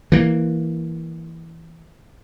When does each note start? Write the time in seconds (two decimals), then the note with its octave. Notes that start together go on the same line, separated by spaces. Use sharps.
0.12 E3 A#3